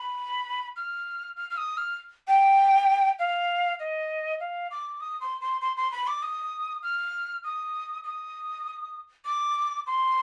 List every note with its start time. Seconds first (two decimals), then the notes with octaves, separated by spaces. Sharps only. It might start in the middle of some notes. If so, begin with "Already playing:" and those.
Already playing: B5
0.76 F6
1.36 F6
1.50 F6
1.57 D#6
1.77 F6
2.27 G5
3.19 F5
3.80 D#5
4.40 F5
4.71 D6
5.01 D#6
5.21 C6
5.41 C6
5.61 C6
5.77 C6
5.92 B5
6.07 D6
6.22 D#6
6.83 F6
7.44 D#6
8.04 D#6
9.25 D6
9.87 C6